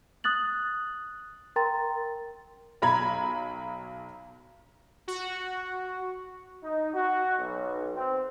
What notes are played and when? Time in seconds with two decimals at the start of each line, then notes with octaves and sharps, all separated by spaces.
0.24 D#6 F#6 A6 F#7
1.56 A#4 G5 A#5 C6 A6
2.82 B1 A#5 B5 G#6
5.08 F#4
6.64 D#4
6.93 F#4
7.39 B1
7.96 C4